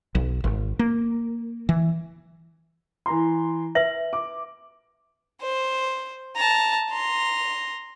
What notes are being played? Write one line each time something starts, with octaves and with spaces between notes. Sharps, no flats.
B1
G#1
A#3
E3
E3 A#5 C6
B4 E5 F#7
D6
C5
A5 A#5
A#5 C6